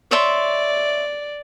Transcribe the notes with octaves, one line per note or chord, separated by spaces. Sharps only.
C#5 D5 E5 C6